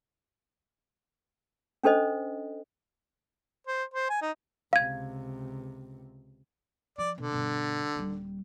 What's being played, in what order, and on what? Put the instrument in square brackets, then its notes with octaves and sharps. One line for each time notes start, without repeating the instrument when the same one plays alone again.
[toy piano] C#4 D4 A4 C5 D#5
[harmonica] C5
C5
G#5
D#4
[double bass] C#2 C3 [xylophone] F5 G#6
[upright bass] F3 [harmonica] D5
[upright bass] B2 [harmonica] D3
[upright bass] G2 B2
D#1 G3